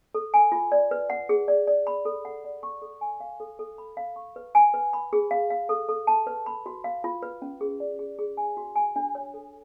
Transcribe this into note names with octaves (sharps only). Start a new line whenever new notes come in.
A4
G#5
F4
D5
B4
F#5
G#4
D5
D5
B5
A4
F#5
D5
C#6
A4
G#5
F5
A4
A4
B5
F5
C#6
B4
G#5
B4
B5
G#4
F5
F5
A4
A4
A5
B4
B5
F#4
F5
F4
B4
C#4
G#4
D5
G#4
G#4
G#5
F#4
G#5
D4
C#5
A4